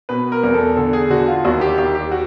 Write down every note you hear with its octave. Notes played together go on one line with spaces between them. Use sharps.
B2 B4
A#4
E2
A4
D3 A4
G#4
D3 F#4
F4
D#2 F#4
G4
D#2 G4
G4
F#4